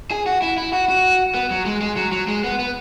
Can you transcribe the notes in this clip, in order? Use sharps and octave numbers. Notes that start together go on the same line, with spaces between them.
G#4
F#4
E4
E4
F#4
F#4
B3
F#3
G#3
G#3
F#3
F#3
G#3
B3
B3